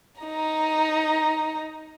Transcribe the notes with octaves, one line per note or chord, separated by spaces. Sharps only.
D#4 A#5